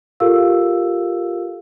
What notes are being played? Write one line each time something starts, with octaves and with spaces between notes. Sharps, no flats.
F4 G4 A4 A#4 F5 E6